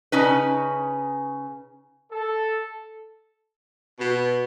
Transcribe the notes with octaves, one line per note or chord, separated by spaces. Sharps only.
C#3 C#4 D#4 B4
A4
B2